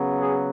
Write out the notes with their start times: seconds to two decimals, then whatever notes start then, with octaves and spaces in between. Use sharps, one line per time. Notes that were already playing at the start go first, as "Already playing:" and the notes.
Already playing: C#3 F#3 B3
0.20 G#4